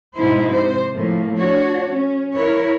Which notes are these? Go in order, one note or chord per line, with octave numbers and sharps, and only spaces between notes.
G#2 B2 G#3 D#4 E4 C5
C3 C5
A2 F3 A#3
D4 F#4 C#5
C#4
E4 A#4 B4 C#5